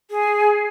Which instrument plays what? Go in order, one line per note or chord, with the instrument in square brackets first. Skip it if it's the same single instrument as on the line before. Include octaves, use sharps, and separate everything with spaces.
[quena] G#4